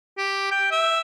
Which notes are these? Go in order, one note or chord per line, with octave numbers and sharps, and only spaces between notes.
G4
G5
E5